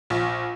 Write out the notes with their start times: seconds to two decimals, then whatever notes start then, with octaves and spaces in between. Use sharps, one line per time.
0.10 A#1